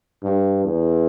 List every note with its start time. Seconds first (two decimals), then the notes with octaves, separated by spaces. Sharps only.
0.23 G2
0.65 E2